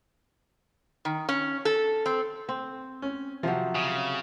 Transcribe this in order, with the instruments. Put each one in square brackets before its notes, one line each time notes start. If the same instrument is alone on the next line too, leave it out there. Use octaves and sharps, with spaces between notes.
[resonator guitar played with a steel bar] D#3
C#4
A4
C4
[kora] C4
[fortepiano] C#4
[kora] C3 F#3 [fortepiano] F3
[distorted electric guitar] C#3